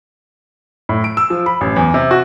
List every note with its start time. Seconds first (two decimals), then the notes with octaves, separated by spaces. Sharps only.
0.89 A2
1.04 D7
1.17 E6
1.30 F3
1.46 B5
1.61 A1
1.76 E2
1.94 C3
2.11 F#4